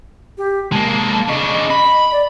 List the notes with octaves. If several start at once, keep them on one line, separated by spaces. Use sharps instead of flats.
G4
G#3 A#3 A5
C#3 D4 D#5
B5
D5